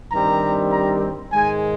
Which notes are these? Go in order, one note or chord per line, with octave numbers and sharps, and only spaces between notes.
G2 D#3 G3 C4 A#5
A#5
G#2 D#3 G#3 G#5